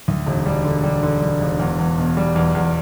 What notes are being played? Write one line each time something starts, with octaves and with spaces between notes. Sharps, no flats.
D2
E1
G3
D3
G3
D3
G3
E1
E2
E2
B2
G3
E2
E2